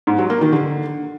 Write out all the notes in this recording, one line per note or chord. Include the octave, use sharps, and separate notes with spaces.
G#2
F#3
A#3
D#3
D3